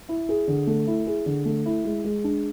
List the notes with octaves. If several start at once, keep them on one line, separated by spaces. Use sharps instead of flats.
E4
G#4
D3
A3
E4
G#4
D3
A3
E4
G#3
G#3
D4